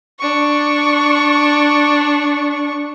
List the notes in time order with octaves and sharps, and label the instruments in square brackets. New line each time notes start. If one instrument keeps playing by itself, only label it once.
[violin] D4 C#6